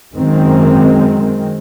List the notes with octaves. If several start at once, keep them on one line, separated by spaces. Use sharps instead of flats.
F#2 D#3 G#3 C4